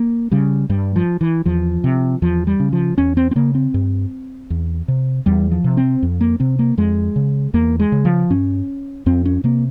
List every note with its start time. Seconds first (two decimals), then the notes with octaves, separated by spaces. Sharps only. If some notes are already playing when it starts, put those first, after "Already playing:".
Already playing: A#3
0.31 C#3 G3
0.69 G2 G3
0.96 F3
1.21 E3
1.45 E2 F3
1.84 C3
2.22 E2 F3
2.47 G3
2.60 C#3
2.72 F3
2.98 E2 C#4
3.17 C4
3.31 C4
3.35 C#3 A#3
3.55 C4
3.74 G2
4.50 E2
4.88 C3
5.26 E2 G3
5.51 F3
5.64 C3
5.77 C4
6.03 F2
6.21 A#3
6.40 C3 C4
6.59 A#3
6.78 F2 G#3
7.16 C#3
7.54 E2 A#3
7.80 G#3
7.92 C#3
8.05 F3
8.30 G2 C#4
9.06 F2 C4
9.25 C#4
9.44 C3 A#3